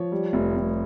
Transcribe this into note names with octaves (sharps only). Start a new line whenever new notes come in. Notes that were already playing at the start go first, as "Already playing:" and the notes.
Already playing: F3 C#5
G3
F1
F1